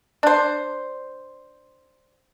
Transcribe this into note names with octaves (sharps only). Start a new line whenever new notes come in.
D4 C5